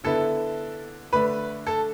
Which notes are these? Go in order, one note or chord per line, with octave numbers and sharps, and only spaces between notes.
D3 B3 E4 A4 A5
D3 A3 D4 B4 B5
A4 A5